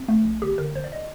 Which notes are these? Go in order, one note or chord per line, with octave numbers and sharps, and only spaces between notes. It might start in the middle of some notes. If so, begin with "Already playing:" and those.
Already playing: C4
A3
A#1
G1 G4
D3 A#4
G1 C5
D5
D#5